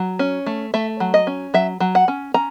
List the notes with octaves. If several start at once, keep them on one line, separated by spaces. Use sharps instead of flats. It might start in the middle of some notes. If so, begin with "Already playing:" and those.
Already playing: F#3
C#4
A3
A3 E5
F#3
D#5
C#4
F#3 E5
F#3
F#5
C#4
C#4 A#5